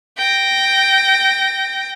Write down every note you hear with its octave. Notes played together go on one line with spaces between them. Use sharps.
G5 A#6